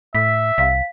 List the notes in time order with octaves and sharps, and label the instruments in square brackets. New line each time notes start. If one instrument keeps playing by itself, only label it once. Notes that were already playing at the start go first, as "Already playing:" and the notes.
[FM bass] A2 [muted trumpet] E5 [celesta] B6
[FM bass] C2 [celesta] F5 B6